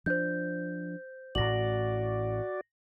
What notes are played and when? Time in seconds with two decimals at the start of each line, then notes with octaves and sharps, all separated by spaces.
0.06 F3 D4 C5 G6
1.35 A1 A2 F#4 D5 A#6 F#7